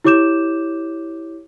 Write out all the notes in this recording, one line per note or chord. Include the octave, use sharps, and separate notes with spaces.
E4 G4 C#5 D6 G6 E7